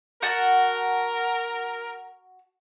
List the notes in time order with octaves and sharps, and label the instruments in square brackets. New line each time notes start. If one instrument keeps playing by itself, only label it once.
[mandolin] F#4 F#5 A5 [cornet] A#4